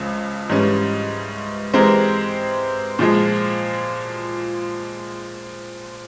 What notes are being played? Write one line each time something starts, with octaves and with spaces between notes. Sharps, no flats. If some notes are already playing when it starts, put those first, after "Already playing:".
Already playing: C#2 C#3 F3
G#2 E3 G3 C#4
E3 G#3 C4 G4 A#4
A#2 F3 G#3